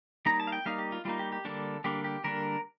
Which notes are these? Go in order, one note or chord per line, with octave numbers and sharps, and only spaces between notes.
G3 A#3 D#4 A#5
A5
F5
G5
G3 A#3 D#4 F5
G4
F4
G3 A#3 D#4 F4
G4
G4
D3 G3 A#3 D4 A4
D3 G3 A#3 D4 G4
G4
D3 G3 A#3 D4 A#4